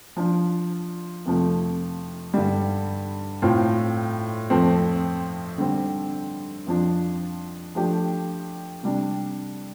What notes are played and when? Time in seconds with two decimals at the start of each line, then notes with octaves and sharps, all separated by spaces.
0.17 F3 D4 F4
1.25 F2 C3 F3 A3
2.34 G2 D3 G3
3.42 A2 A3 C4 F4
4.50 F2 F3 A3 C4
5.58 D3 G3 C4
6.67 F2 F3 D4 F4
7.75 F3 A3 D4 G4
8.83 C3 G3 D4